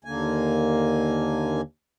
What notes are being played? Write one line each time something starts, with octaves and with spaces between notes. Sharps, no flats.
D#2 D3 A#3 G#5